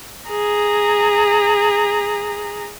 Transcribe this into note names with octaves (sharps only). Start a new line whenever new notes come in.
G#4 A#5